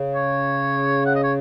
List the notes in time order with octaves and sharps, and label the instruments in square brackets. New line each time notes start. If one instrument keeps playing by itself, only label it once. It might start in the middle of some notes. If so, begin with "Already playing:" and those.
Already playing: [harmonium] C#3
[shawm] C#5
F#5
D#5
C#5